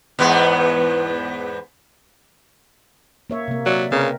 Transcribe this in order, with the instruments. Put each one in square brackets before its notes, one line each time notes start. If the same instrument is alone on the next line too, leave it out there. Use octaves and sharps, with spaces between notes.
[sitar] E2 G#2 B3
[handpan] A#3 C#5 E5
C3 A#3
[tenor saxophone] F#3 [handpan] D5 E5
[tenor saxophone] C#3 [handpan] C4 A#4 B4